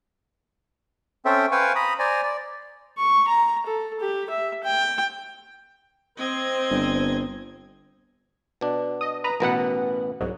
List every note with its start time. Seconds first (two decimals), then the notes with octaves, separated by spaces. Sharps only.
1.25 C4 C#4 A4 C5 E5 G5
1.52 B4 C5 F5 G5 G#5 C#6
1.76 A#5 B5 D#6
1.99 C5 D5 G#5 A#5
2.23 D5
2.98 C#6
3.28 A#5
3.66 A4
4.00 G4
4.30 E5
4.64 G5
6.18 C4 D#5 G#6
6.70 G1
8.61 B2 D4
9.01 D#5 D#6
9.24 B4 A#5 D#6
9.40 A1 B2 B3 A#4 B4 F#5
10.20 C2 G#2 F#3